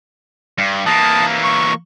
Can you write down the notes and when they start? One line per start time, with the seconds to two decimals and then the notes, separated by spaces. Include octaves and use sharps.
0.58 G2
0.86 E3 A#3 A5 D#6
1.44 C#6